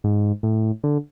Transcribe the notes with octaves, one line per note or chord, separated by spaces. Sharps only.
G#2
A2
D3